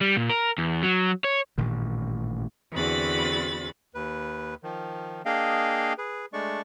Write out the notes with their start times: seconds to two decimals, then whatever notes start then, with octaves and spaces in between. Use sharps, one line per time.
0.01 G3
0.17 A#2
0.29 A#4
0.58 E2
0.83 F#3
1.24 C#5
1.58 A1 G2 A#2 D#3
2.72 E2 D3 C4 F#4 B5 A6
3.94 D#2 B4
4.63 D#3 F3
5.26 A#3 D4 G#4 D#5 F5 G5
5.98 G#4 B4
6.33 G#3 A3 D4 D5 C#6